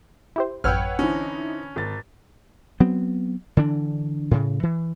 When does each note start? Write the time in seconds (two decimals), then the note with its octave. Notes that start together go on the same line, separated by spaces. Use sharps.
0.36 E4 G4 C5
0.64 A1 F#2 B4 C#5 F#5 G5 E6 F6
0.99 D3 E3 C4 C#4 D#4
1.76 G#1 A6
2.80 F#3 B3 C4
3.57 D3 E3 D4
4.31 A2 C#3
4.63 E3